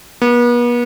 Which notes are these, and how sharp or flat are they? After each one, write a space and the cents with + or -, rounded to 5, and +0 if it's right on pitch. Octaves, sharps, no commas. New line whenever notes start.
B3 -40